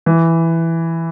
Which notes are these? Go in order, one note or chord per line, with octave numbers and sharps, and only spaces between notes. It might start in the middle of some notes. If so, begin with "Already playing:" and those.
E3